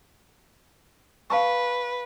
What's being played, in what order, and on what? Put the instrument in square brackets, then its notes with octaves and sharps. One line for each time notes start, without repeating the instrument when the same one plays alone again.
[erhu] B4 [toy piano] F5 A5 C#6